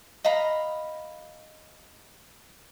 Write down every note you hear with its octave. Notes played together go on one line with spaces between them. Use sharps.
D#5 F5 A#5 B5